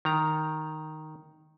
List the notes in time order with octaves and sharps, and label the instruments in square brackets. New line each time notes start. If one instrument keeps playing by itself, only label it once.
[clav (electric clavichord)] D#3 A#5